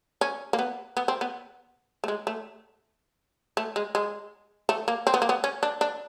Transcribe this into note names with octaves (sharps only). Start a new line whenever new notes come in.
C#4
A#3
B3
B3
C4
B3
A3
G#3
A3
A3
G#3
G#3
A3
A#3
C4
B3
A#3
B3
C#4
D4
D4